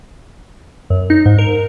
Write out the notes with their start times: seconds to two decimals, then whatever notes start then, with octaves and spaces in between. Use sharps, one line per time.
0.90 F#2
1.10 D#4
1.26 G#2
1.38 A#4